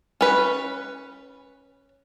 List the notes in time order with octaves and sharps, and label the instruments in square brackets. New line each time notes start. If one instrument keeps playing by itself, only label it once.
[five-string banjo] C#4 B4